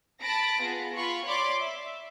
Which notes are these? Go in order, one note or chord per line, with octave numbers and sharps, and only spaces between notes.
A5 B5 A6 A#6 D7
B3 F4 G#4
F4 B5 C#6
C#5 D5 B5 C6 D6
E5